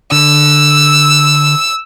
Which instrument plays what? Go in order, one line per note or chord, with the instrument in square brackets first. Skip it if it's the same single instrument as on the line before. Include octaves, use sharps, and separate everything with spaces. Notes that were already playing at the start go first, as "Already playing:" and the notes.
[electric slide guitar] D3 [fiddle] E6